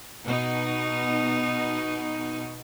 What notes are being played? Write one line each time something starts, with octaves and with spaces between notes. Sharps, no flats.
B2 D#4